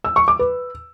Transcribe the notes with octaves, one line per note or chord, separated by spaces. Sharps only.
E6
C#6
D6
B4